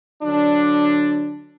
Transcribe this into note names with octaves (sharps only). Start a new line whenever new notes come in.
D3 F#3 D4